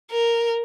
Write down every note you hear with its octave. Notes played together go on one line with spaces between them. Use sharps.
A#4